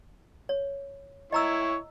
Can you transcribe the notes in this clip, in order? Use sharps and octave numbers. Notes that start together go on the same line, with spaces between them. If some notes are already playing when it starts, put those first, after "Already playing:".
C#5
E4 C#5 D#5 A#5 E6